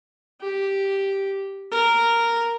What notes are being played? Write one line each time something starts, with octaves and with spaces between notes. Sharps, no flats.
G4
A#4